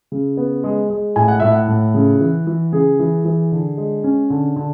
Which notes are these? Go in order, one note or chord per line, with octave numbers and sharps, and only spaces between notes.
C#3
B3
G#3
G#3
A2 G#5
F#5
A2 E5
F#5
A2
C#3
E3
E3
C#3 G#4
E3
E3
D3
G#3
C#4
D3
D3